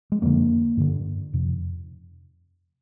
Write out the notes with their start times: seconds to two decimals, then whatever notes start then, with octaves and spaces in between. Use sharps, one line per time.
0.12 G#3
0.22 F2 D3 A#3
0.77 G2 D3
1.33 F2 C3